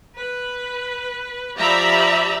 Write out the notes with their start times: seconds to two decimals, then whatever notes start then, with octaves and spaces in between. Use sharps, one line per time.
0.15 B4
1.59 F3 G4 D5 E5 A#5 B5